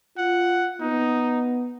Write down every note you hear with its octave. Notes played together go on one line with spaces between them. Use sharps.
F4 F#5
B3 D#4